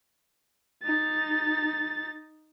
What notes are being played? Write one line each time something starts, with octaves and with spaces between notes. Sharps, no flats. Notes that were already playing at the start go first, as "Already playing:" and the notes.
D#4 A6